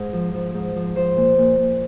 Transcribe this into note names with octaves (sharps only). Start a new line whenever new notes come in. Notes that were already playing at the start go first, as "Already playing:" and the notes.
Already playing: G#2
F3
F3
G#2
F3
F3 C5
A#2
A#2
A#2